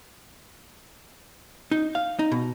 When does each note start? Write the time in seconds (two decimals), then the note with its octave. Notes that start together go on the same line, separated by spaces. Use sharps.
1.71 D#4
1.95 F5
2.19 D#4
2.32 B2